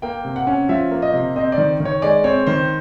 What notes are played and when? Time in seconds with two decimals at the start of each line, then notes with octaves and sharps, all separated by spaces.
0.02 A#3 G5
0.25 C3
0.36 F#5
0.47 C#4
0.69 F3 E5
0.91 A#3
1.02 D#5
1.13 C3
1.36 C4 D#5
1.52 D5
1.58 D#3
1.80 D#3
1.85 C#5
2.02 G#3 D5
2.24 C4 C#5
2.47 D#3 C5